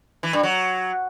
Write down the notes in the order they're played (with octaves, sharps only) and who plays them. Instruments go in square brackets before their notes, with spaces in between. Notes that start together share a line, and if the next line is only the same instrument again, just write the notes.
[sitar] E3
G2
F#3